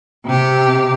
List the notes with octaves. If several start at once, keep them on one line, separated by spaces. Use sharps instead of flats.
C3 G4